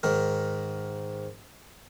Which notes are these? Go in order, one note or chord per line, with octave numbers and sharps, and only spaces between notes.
G#2 D#3 A#4